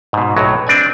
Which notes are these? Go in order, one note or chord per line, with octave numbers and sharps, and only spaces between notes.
G#2 B2
B1 A2 F#3
C4 D4 D5 G#5